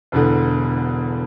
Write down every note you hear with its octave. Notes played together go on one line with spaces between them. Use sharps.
E1 E2 D3